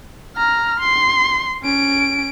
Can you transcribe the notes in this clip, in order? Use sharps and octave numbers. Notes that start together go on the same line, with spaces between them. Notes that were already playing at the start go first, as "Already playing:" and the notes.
A#5 F6
C6
C#4 D7